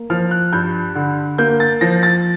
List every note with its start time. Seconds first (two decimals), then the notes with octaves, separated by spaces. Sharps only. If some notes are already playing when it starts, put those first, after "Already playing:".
Already playing: A#3
0.10 F3 F6
0.31 F#6
0.53 G2 G6
0.95 D3
1.38 A#3 G6
1.60 A6
1.81 F3 A#6
2.03 A6